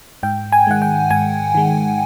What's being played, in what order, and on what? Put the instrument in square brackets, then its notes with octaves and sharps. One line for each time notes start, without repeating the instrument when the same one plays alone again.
[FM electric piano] G#2 G5
G#5
D#3 G#3 F#5
G5
G#2 G#5
D#3 G#3